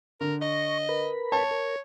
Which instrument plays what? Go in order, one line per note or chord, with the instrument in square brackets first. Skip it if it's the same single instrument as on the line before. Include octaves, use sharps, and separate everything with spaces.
[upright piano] D3 [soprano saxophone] A#4
[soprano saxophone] D#5 [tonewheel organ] C#6 A#6
[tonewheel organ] A#4 B4 B5
[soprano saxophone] C#5 [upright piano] A5
[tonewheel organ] A#4